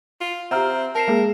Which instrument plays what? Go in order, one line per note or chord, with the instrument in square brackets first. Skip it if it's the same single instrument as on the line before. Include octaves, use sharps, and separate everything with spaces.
[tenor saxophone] F4
[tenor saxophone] C4 [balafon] G4 F#5 [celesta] E5 A#5 F6
[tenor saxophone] A#4 [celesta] A5 C7 E7
[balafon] G#3 A#3 G#4